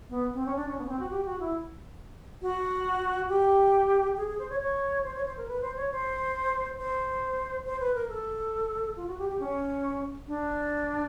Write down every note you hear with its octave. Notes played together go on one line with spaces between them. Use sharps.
B3
C4
C#4
D4
C#4
B3
C#4
C4
F#4
G4
F#4
E4
F#4
G4
G#4
G#4
C5
C#5
C#5
C5
C#5
C5
A#4
B4
C5
C#5
C5
C5
C5
B4
A#4
A4
F4
F#4
G4
G4
C#4
D4